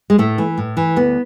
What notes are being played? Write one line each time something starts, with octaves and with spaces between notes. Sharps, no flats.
G#3
A2 A3
E3
A2
E3
D2 B3